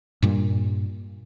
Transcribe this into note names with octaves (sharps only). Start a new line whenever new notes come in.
G2 A#2 G3